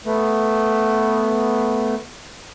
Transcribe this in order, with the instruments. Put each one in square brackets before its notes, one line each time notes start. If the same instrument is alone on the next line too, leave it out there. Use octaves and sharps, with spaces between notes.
[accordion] A3 B3